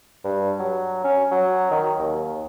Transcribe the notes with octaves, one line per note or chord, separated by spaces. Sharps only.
G2
F#3
C#4
F#3
D#3
D#2